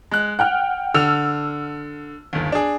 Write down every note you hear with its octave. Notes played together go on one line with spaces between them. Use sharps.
G#3 F#6
F#5 G5 F6 F#6
D3 E6 F6 F7
G1 D#2
D4 G#4